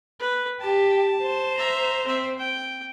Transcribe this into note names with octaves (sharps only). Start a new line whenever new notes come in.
B4
G4 A5
C5
E5 A#5
C4 E5
G5